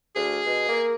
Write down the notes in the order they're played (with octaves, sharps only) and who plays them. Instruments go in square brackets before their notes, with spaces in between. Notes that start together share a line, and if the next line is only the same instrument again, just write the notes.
[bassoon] D2 [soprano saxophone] G#4
[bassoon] B2
A#3